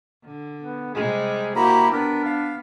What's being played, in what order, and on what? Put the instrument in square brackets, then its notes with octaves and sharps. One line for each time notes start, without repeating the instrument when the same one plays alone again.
[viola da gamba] D3
[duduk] B3
[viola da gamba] C3 G3 G#3 [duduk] G#4
[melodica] A#3 A#5 B5 [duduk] E4 [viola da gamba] F#4 G4
[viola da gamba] B3 [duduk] D4 [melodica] A#4
[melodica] F5